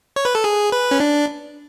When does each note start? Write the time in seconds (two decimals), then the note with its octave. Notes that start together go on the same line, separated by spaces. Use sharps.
0.16 C#5
0.25 B4
0.35 A4
0.44 G#4
0.72 B4
0.91 C#4
1.00 D4